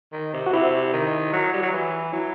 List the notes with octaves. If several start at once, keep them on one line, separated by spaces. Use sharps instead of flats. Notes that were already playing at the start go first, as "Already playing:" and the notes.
D#3
C3
F#4
C3 E4
D#3
F#3
G3
F#3
E3
F#3 E4